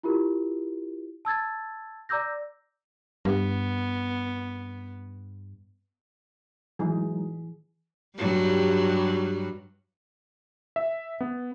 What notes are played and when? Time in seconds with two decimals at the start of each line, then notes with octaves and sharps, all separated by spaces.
0.03 E4 F4 G4 A#4
1.25 A5 E6 G#6 A6
2.09 D5 A#5 D6 E6 G6 A#6
3.25 G2 B3
6.79 E3 F#3 G#3 D#4 G#4
8.18 G2 F#3 G3
10.76 E5
11.21 B3